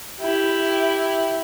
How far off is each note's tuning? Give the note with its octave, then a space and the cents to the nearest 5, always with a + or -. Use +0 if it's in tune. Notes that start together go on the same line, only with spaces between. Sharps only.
E4 +0 G4 +0